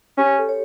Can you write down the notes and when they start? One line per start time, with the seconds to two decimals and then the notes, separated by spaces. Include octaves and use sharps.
0.18 C#4 G4
0.38 A4
0.49 C#5